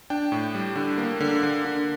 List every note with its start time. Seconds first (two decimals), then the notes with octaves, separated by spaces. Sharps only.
0.10 D4 G5
0.32 A2
0.55 G3
0.76 D3
0.98 A#3
1.20 D3
1.43 D3
1.65 D3